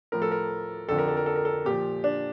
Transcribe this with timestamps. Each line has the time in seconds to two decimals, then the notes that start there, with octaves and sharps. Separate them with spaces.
0.12 A2 F3 A#4
0.22 A4
0.31 A#4
0.88 F2 D3 F3 A4
0.98 A#4
1.08 A4
1.17 A#4
1.26 A4
1.35 A#4
1.45 A4
1.65 A#2 F3 G4
2.04 D4